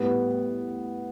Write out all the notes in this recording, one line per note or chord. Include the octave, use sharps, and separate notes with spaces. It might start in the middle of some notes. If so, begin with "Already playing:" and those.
Already playing: A2 G3 B3